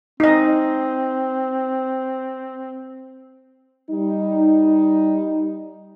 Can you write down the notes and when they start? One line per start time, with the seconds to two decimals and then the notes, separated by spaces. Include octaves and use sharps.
0.20 C4 D#4 D#5
3.91 G3 D#4